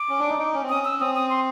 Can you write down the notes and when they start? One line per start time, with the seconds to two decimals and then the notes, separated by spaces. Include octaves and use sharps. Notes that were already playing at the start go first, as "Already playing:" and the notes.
Already playing: D6
0.09 C#4
0.19 D4
0.29 D#4
0.39 D#4
0.54 C#4
0.63 C4
0.69 C#4 D#6
0.85 E6
1.00 C4 D#6
1.16 D#6
1.30 C6